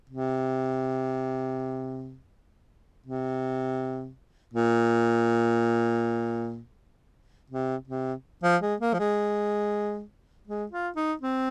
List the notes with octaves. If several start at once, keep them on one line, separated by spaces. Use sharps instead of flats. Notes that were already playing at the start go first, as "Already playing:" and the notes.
C3
C3
A#2
C3
C3
F3
G#3
A#3
F3
G#3
G#3
F4
D#4
C4